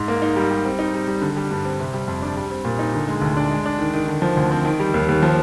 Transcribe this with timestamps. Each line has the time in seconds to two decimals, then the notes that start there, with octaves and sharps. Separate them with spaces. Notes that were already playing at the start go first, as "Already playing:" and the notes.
Already playing: G#2
0.08 A#3
0.22 D#4
0.36 G3
0.51 G3
0.65 C4
0.79 D#4
0.94 G3
1.07 G3
1.22 D3
1.37 G3
1.51 G2
1.65 C4
1.80 C3
1.94 G3
2.08 F2
2.22 D4
2.37 G3
2.51 C4
2.65 A#2
2.79 D#4
2.94 D3
3.08 G#3
3.22 D2
3.37 D4
3.50 G#3
3.66 D4
3.79 D#3
3.94 D#3
4.08 D3
4.22 F3
4.37 D2
4.51 C4
4.65 D#3
4.80 G3
4.94 D#2
5.09 D#2
5.23 F3